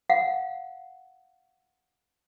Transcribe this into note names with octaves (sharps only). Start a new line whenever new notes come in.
F5 F#5